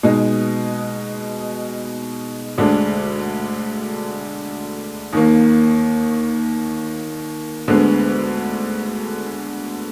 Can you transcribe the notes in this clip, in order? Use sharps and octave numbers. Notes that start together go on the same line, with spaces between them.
B2 G#3 D#4
D2 D3 G#3 D4
D#2 D#3 A#3
D2 D3 G#3 B3